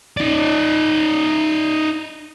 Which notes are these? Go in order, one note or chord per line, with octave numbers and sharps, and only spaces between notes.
D#4 D5